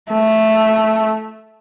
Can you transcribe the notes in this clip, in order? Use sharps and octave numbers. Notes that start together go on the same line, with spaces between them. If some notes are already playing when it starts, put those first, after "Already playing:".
A3